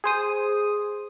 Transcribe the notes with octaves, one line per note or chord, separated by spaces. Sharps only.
G#4 C5 D#6